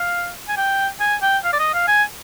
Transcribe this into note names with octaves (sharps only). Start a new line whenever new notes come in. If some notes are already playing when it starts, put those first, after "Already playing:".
Already playing: F5
G#5
G5
G#5
G5
F5
D5
D#5
F5
G#5